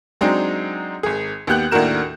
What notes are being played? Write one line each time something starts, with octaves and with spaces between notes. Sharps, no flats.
F#3 G#3 C4 D4 D#4
G#1 G#4
D#2 B3 G4 F#6 G6 F#7
D#2 A2 D4 F#4 A#4 E7